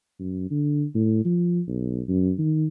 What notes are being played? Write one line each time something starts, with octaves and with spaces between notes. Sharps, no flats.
F#2
D3
A2
F3
B1
F#2
D#3